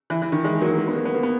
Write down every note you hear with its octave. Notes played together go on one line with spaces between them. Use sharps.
E3
E3
D#3
E3 G#3
F#3 A#3
A#3
B3
A#3
B3
A#3
B3